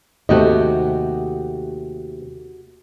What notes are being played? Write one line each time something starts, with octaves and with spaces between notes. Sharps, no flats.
D#2 C3 A3 F#4 G4 D#5